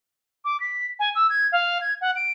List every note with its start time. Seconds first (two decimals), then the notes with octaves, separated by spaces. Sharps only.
0.45 D6
0.60 B6
0.99 G#5
1.15 E6
1.30 G#6
1.52 F5
1.81 G#6
2.01 F#5
2.16 D7